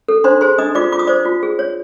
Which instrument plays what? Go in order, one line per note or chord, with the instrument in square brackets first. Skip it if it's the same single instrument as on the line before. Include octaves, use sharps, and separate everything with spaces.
[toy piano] A4
D4 C5 C6
G#4 C5 C6
D4 D#5 D#6
F4 D5 D6
F4 D6
D#6
C5 D5 D6
F4
G#4
C#5